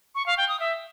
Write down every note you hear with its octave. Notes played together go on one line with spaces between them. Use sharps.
C#6
F5
G5
D#6
E5